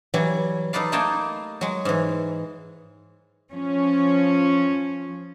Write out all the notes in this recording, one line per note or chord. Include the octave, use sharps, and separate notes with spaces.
E3 F#3 G3
D#4 A4 B4 D5 F5
A3 A#3 D#4 E4 G5 A5
F#3 G#3
G#2 E3
F3 C#4